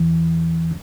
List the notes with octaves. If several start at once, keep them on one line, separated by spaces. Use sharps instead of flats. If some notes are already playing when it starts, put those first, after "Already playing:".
Already playing: E2 E3